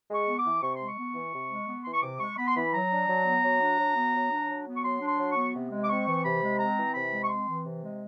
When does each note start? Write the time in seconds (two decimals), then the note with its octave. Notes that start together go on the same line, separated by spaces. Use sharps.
0.10 G#3
0.15 C#6
0.27 B3
0.39 E3 D6
0.62 C3 C#6
0.75 G#3 C6
0.88 C#6
0.98 B3
1.15 E3
1.33 C3
1.50 G#3
1.68 B3
1.83 E3 C6
1.93 C#6
2.03 C3 D6
2.20 G#3 C#6
2.38 B3 B5
2.48 C6
2.55 E3 B5
2.72 F#3 A#5
2.91 D4
3.08 F#3
3.26 B3
3.43 F#3
3.61 D4
3.79 F#3
3.96 B3
4.14 F#3
4.31 D4
4.49 F#3
4.67 B3
4.76 C#6
4.84 F#3 C6
5.01 D4
5.08 C6
5.19 F#3
5.31 C#6
5.36 B3
5.54 C3
5.71 G#3
5.84 D6
5.89 C4 C#6
6.07 E3
6.24 C3 B5
6.42 G#3
6.59 C4 A#5
6.78 E3
6.94 C3 B5
7.12 G#3
7.23 C#6
7.29 C4 C6
7.47 E3
7.65 C3
7.83 G#3